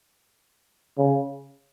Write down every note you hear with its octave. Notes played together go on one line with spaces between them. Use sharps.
C#3